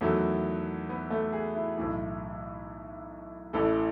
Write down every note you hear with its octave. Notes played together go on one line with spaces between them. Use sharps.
E2 D#3 F#3 A3
B3
A3
G#4
E4
B1 A2 E3
A1 A2 E3 A4